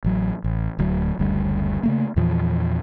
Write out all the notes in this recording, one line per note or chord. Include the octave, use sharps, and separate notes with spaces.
A1 F#3
A1
D1 D2 F#3
F#1 D2 G3
C#3 A3 A#3
E2 A#2 E3 F3